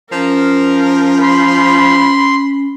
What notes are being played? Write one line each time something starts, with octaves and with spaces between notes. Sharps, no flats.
F3 C#4 A#4
B5 C6